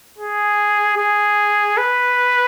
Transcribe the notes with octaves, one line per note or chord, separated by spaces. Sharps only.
G#4
G#4
B4